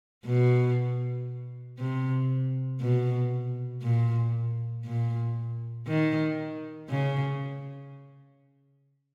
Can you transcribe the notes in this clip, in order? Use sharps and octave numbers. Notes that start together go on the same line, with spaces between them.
B2
C3
B2
A#2
A#2
D#3
C#3